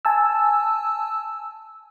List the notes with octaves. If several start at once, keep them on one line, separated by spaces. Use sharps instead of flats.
G#5 A5 E6